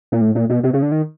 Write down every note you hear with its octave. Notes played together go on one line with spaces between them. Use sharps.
A#2
A2
A#2
B2
C3
C#3
D3
D#3